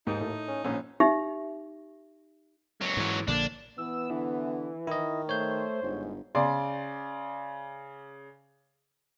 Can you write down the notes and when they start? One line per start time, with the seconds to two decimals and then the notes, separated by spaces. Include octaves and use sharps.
0.07 D#2 G#2 D#4
0.20 A2
0.48 C#4
0.64 A#1 G#2 C#4 E6
1.00 D#4 G4 E5
2.81 C#2 F#3
2.97 G#2 E3
3.28 A#1 D3 A#3 D4
3.78 E3 B3 E6
4.10 D3 E3
4.87 D#3 E4 D#5
5.29 A3 C5 C#5 G6
5.83 G1 G#2
6.35 C#3 D5 C6